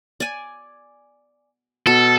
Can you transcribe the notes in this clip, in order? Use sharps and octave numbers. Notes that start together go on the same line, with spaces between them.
D5 G#5
B2 A4